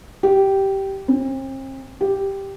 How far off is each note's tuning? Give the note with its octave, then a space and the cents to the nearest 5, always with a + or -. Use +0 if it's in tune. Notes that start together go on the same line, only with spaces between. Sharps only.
G4 -10
C4 +40
G4 +0